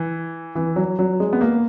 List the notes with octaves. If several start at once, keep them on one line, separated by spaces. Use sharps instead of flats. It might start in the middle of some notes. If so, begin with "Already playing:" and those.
Already playing: E3
E3
F#3
F#3
G#3
B3
A#3